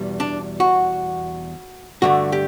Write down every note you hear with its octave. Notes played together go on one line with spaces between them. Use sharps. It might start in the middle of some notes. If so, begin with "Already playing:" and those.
Already playing: E2 B2 G3
D4
F#4
G2 D3 A3 F#4
G4